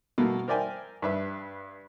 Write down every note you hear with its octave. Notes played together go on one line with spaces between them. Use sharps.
B2 A3 A#3
A#4 C5 D5 E5 G5 G#5
G2 B4 E5